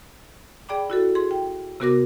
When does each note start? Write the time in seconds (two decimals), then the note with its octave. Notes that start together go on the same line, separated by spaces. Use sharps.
0.69 G#4 D5 G5 B5 D6
0.90 E4 F#4 A4
1.15 G#4 C6
1.31 G5
1.80 C3 B3 F#4 A#4 D6 A#6